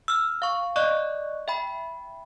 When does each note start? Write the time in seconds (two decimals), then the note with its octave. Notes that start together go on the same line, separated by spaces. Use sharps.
0.08 E6 F6
0.42 F5 C#6
0.76 D5 D#5 C#6 F#6
1.48 E5 G5 B5